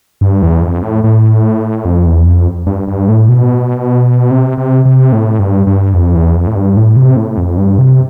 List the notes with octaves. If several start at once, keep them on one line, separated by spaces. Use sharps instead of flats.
G2
E2
F2
A2
A2
F2
E2
F2
G2
G2
A2
B2
C3
C3
C3
A2
G2
G2
F2
E2
F2
A2
G2
A2
C3
A2
F2
G2
C3